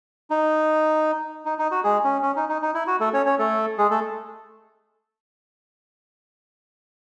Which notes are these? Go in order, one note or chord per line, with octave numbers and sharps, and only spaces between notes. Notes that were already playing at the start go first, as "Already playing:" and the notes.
D#4
D#4
D#4
F#4
G#3 G#4
C#4
C#4
D#4
D#4
D#4
E4
F#4
A3 A4
C#4 C#5
C#4 C#5
A3 A4
G#3 G#4
A3 A4